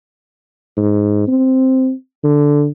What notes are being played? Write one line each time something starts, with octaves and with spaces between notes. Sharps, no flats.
G#2
C4
D3